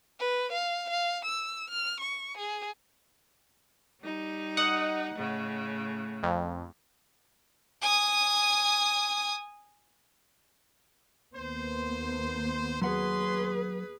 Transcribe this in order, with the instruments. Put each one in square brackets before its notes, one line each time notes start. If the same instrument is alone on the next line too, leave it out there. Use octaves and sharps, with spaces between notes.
[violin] B4
F5
F5
E6
F6
C#6
G#4
[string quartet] G3 D#4
[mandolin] D#5 [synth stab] F#5
[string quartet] A2 C#3
[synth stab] F2
[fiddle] G#5 D#6
[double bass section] D#2 A#3 B3 [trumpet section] C5
[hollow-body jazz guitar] F#3 F#5 [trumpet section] C#4 C6 [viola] G#4 B4